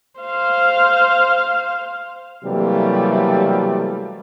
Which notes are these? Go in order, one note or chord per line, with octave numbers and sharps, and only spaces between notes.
C5 F5
C3 E3 F#3 G3 A3 A#3